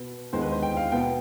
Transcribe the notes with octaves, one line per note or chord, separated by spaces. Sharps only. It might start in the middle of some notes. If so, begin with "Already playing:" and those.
Already playing: B2 B3
D#2 D3 G#3 B3 C5
B4
C5
G5
F5
B2 B3 G5